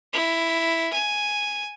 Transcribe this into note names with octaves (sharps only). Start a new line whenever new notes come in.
E4
G#5